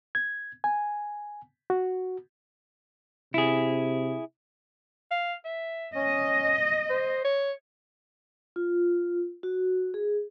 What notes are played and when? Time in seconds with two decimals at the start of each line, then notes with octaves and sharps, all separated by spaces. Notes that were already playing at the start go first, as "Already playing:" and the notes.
0.15 G#6
0.64 G#5
1.70 F#4
3.34 C3 E4 G#4
5.11 F5
5.45 E5
5.95 C#4 D#5
6.90 C5
7.25 C#5
8.56 F4
9.43 F#4
9.94 G#4